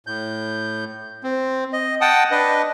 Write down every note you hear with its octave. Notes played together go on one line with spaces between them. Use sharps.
A2 G6
C4
D#5
F#5 G5 A5 D#6
D4 B4 D#5